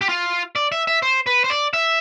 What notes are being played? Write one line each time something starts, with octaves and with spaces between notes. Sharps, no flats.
G4
F4
D5
E5
E5
C5
B4
C5
D5
E5